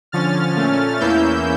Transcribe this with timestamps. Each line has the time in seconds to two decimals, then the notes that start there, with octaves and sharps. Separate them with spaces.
0.12 D3 F3 C#4 F6 A6
0.56 A#2 A3 C#4
1.00 E2 E3 A#3 C#4 E4 E6 G6